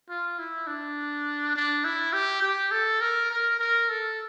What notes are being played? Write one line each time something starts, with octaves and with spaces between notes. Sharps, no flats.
F4
E4
D4
D4
E4
G4
G4
A4
A#4
A#4
A#4
A4